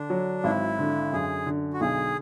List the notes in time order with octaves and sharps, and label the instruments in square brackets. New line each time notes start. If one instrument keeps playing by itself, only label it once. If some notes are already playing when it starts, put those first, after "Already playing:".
Already playing: [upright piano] D3 [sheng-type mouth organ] D4
[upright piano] F#3
[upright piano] G#1 [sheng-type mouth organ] E4
[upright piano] D3
[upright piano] F#2 [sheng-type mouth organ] G#4
[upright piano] D3
[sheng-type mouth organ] F#4
[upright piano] B1 [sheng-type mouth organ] G#4